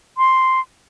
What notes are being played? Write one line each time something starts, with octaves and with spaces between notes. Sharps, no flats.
C6